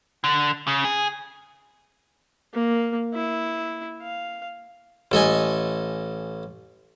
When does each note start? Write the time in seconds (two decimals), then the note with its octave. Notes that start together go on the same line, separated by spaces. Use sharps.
0.24 D3
0.67 C#3
0.85 G#4
2.53 A#3
3.14 E4
4.02 F5
5.12 A1 A4 D#5 G#5